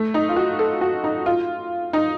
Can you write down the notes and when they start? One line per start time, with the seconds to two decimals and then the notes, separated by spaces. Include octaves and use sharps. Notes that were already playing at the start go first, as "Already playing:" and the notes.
Already playing: A3
0.14 D#4
0.29 F4
0.36 F#4
0.59 A4
0.81 F#4
1.04 D#4
1.26 F4
1.93 D#4